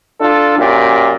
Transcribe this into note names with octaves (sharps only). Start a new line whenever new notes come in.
D4 F4 A4
F#2 A#2 G4